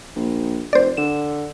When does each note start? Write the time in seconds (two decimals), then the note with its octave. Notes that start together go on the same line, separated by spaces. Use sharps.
0.16 A#1
0.73 F1 C5 D5
0.97 D3 E7